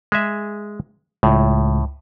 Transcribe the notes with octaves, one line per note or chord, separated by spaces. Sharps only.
G#3 G#4 E5
C#2 A2